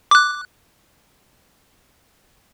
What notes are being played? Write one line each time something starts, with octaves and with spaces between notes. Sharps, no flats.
D6 F#6